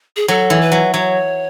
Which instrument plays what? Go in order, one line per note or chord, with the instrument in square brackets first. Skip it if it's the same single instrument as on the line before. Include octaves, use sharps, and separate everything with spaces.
[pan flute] G#4
[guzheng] F#3 [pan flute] A4
[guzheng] E3
[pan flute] B4
[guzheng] F#3
[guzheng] F#3 [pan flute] C#5